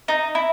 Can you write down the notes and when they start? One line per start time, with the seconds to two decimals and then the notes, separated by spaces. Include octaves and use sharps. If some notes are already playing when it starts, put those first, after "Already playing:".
0.08 D#4
0.35 E4